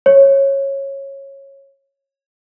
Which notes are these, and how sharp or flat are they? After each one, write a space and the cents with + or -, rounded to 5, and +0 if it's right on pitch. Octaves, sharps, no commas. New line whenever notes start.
C#5 -15